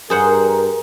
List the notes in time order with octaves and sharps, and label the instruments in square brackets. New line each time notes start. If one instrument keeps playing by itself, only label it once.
[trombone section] G2 A#4 [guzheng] G#4 C5 F#5